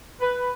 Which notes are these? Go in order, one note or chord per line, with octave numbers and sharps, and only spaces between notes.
B4